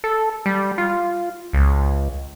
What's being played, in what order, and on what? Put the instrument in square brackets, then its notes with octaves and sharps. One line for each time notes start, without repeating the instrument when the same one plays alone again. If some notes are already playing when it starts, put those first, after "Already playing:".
[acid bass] A4
G3
F4
C#2